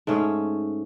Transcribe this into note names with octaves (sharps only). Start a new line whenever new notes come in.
G#2 A3 C#4 G#4